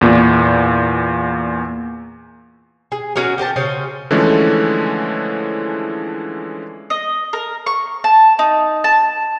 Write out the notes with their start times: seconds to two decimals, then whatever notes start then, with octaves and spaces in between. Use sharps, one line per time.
0.01 E2 A#2
2.92 G#4
3.16 C#4 F#4 G#4 A#4
3.38 G4 A#4 C5 A5
3.56 C#3 C#4 C5
4.11 D3 E3 F3 G#3 A3 C#4
6.90 D#5
7.33 A#4
7.66 C#6
8.04 A5
8.39 D#4
8.84 A5